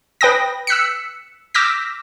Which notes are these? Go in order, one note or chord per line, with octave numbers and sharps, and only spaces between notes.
B4 G5 D#6 A#6
E6 F#6 B6 C#7
D6 E6 F6 G6 A#6 B6